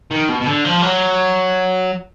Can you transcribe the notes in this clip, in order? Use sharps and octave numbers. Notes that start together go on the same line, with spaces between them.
D#3
B2
B2
D3
F3
F#3